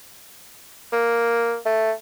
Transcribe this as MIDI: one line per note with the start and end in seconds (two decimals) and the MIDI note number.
0.92 1.57 58
1.65 1.92 57